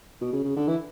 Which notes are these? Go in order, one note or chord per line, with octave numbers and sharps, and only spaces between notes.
B2
C#3
C#3
D3
E3